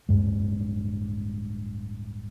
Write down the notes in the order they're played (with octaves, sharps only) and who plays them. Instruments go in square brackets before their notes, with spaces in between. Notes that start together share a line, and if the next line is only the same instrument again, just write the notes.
[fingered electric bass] D1 C2 G2 G#3